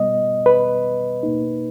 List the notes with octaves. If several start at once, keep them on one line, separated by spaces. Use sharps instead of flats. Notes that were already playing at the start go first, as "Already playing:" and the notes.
Already playing: B2 G3 B3 D#5
B4
B2 A#3 D#4